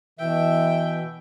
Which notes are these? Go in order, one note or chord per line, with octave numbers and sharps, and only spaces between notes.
B2 E3 E5 G5